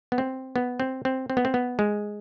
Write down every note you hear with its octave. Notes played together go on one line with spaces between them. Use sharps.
B3
C4
B3
C4
C4
C4
B3
C4
B3
G#3